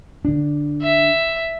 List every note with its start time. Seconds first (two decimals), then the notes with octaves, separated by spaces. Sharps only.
0.25 D3 D4
0.82 E5